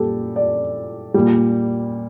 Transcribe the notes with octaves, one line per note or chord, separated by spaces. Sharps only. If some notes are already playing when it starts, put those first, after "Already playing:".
Already playing: A#2 G3 G4 A4
D5
A#2 G3